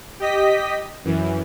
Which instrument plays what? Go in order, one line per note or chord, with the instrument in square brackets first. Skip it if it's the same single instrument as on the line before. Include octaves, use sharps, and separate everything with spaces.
[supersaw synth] G4 D#5 B6
F#2 E3